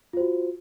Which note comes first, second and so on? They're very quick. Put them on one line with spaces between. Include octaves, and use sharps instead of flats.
F4 C5 F#4